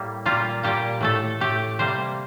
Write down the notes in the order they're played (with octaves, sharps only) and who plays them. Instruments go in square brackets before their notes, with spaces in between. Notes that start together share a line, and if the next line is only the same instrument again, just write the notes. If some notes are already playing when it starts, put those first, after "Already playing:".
Already playing: [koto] A2 G3 A#3
A#2 G3 A#3 F4
A#2 G3 A#3 G4
A2 A3 A4
A2 A3 G4
C3 G3 A#3 C5